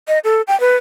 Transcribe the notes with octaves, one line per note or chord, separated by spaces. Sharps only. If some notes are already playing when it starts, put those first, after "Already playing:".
D#5
A4
G5
B4